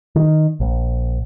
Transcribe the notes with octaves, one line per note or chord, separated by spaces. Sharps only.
D#3
A#1